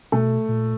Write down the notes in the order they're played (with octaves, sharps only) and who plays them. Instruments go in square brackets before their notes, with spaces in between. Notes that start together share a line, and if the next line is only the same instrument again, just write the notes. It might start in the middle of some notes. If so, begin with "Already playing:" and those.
[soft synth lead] B2 [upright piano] A3
[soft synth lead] A#2